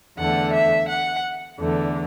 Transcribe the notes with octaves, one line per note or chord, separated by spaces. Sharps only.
E2 D3 A3 F#5
E5
F#5
E2 D3 A3